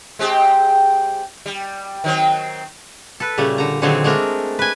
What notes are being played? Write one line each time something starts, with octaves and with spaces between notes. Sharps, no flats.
G#3 C4 G4
G3
D#3 F#3 C4
A4 B4
A#2 C#3 G3 A3
D3 A#5
A#2 D3 D#3 F#3 C4 G#4
G#3 A3 C4 D4 A#4
B4 G#5